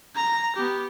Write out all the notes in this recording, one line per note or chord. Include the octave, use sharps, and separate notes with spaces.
A#5
B3 G4